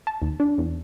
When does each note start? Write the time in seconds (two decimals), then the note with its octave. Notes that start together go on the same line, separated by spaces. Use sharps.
0.07 A5
0.22 D#2
0.40 D4
0.58 E2